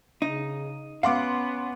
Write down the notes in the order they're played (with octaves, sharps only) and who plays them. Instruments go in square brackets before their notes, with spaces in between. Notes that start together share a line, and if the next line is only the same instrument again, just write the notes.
[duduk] C#3 [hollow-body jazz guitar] D#4
[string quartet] B3 [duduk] C#4 [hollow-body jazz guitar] F5 [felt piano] F#5 C6 D6